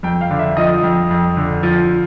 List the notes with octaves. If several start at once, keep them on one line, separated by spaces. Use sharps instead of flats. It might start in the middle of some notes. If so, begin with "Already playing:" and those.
F2 G5
F5
D3
E5
F3 D#5
F2
F2
D3
F3